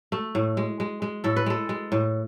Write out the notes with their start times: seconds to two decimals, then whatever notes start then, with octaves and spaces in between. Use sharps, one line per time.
0.12 A3
0.35 A2
0.57 G#3
0.80 G#3
1.02 G#3
1.24 A2 A4
1.36 B4
1.46 G#3 A4
1.69 G#3
1.92 A2